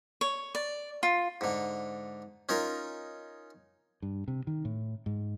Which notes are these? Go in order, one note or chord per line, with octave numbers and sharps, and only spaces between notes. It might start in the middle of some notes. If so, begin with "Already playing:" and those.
C#5
D5
F4
G#2 D3
C#4 D#4 F4 A#4
G2
C3
D#3
A2
G#2